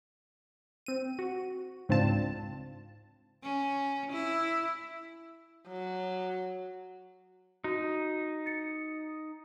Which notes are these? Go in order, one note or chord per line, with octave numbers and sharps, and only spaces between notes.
C4 D#7
F#4
C#2 G#2 C4 D4 F4 A5
C#4
E4
F#3
D#4 F#4
A6 C#7